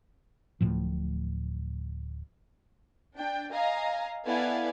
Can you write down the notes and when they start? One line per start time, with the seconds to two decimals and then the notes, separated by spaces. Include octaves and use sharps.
0.61 D1 A2 F3
3.16 D4 G5
3.52 D#5 F5 G#5 A#5
4.26 B3 E4 A4 D5 F5 G#5